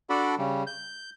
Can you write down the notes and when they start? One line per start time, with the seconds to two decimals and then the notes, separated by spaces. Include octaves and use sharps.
0.10 D4 F#4 A4 D5 B5
0.38 C#3 G3
0.67 G6